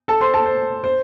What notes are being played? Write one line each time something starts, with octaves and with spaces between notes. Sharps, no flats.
A4 A5
C5 C6
A4 A5
C5
C5